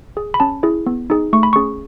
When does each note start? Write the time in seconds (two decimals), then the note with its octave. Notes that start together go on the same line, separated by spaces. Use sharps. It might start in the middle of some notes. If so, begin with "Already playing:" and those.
0.17 G#4
0.34 B5
0.40 C#4 A5
0.63 E4 G#4
0.86 B3
1.10 D#4 G#4
1.33 A3 C#6
1.43 B5
1.53 C#4 G#4 C#6